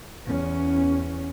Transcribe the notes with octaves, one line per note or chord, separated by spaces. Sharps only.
E2 C#4